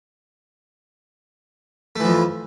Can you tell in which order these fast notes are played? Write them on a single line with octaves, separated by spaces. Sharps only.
A3 E3 F3 F2